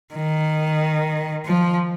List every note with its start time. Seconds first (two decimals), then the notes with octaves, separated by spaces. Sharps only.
0.14 D#3
1.46 F3